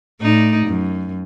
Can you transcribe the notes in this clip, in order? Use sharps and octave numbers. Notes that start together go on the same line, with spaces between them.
A2 D#4 D5
F#2